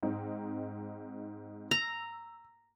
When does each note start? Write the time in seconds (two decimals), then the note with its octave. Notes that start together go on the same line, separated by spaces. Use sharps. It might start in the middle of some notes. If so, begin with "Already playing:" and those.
0.03 G#2 C4 D#4
1.71 A#5 E6